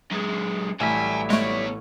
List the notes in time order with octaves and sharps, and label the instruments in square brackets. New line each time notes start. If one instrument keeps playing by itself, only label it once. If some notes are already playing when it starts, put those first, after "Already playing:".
[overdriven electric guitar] F#2 G#3
[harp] A1 A3 [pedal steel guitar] F#3 G3 E4 [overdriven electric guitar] F#5 G#5
[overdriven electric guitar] B2 C#5 [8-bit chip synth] G#3 A3 [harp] C#6 D7